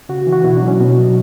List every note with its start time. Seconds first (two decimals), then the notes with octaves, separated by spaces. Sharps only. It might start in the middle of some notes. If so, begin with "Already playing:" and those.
0.09 C#3 F#4
0.27 E3
0.33 F#4
0.44 B2 E4
0.56 D4
0.62 F#3
0.68 C#4
0.80 B2 B3
0.98 F#3